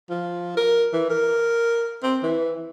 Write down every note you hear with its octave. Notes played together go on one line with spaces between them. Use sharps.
F3
A#4
E3
A#4
C4
E3